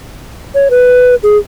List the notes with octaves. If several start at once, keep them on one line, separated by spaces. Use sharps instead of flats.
C#5
B4
G#4